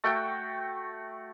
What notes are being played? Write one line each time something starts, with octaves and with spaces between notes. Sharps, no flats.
A3 F#4 G5